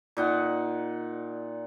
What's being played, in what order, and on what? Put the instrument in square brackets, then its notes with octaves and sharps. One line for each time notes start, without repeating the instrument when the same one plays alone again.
[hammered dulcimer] A#2 D#4 F#5